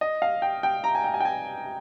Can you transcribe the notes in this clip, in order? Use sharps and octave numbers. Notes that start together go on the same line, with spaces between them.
D#5
F5
G5
G5
A#5
G#5
G5
G#5
G5
G#5